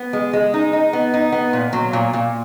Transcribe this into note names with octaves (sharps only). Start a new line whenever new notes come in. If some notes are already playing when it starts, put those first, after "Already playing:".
Already playing: B3
G#3
G#3
D#4
D#4
B3
D#4
B3
A#2
F#3
A#2
A#2